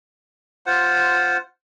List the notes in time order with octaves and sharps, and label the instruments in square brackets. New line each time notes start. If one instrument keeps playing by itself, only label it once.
[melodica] F4 C5 F#5